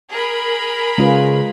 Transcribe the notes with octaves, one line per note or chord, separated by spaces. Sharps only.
G#4 A#4 B5
C#3 G#3 F4 B4